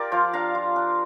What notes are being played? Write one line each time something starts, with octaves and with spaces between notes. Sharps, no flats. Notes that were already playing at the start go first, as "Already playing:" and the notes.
Already playing: F4 G4 A#4 D5
F3 C5 F5
D4 F5 A#5
F4
D4